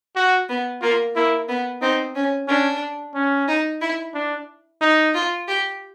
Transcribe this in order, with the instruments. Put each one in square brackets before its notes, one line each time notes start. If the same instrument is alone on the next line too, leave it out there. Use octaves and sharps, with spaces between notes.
[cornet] F#4
[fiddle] B3
[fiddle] A#3 [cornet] F4
[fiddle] A#3 [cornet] E4
[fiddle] B3
[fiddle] C4 [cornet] D#4
[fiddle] C#4
[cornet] C#4 [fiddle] D4
[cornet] C#4
[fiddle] D#4
E4
[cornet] D4
D#4
[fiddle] F4
G4